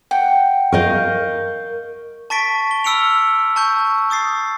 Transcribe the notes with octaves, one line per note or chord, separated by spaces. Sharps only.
F#5 G5
A#4 D#5 F5 C#6 G6
A5 C#6 A6 B6 D7
G7
B5 E6 F6 C#7 D7 F7
A5 C#6 G6
C#6 D#6 A6 C7